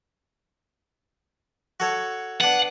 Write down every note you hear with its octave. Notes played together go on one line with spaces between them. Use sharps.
F#4 A4 C#5
B3 D4 F#5